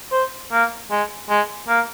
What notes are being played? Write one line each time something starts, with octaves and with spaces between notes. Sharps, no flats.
C5
A#3
G#3
G#3
A#3